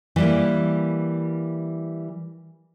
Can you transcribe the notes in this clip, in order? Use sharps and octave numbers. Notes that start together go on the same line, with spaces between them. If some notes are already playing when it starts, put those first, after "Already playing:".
E3 G3 A#3